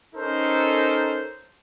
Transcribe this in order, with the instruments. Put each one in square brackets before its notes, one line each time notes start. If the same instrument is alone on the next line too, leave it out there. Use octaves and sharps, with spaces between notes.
[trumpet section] C#4 D#4 A4 A#4 C5